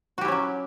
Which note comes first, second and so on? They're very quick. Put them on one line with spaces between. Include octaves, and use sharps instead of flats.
F#4 G4 E4 C#4 F#3